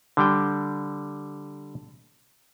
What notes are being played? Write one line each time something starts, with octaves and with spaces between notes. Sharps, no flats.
D3 G3 G5